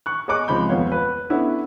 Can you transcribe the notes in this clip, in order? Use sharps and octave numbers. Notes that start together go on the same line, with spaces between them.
C#6 F#6
G#4 C#5 D#5 C#6 D6 F#6
C#2 C3 F3 G#3 B5 G6
D#1 F2 B3 C#5 F5
B4
B3 C#4 D4 E4 A4